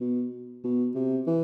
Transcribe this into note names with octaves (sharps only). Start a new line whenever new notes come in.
B2
B2
C3
E3